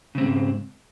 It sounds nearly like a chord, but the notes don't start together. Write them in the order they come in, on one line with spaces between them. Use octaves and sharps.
C#3 C4 G#2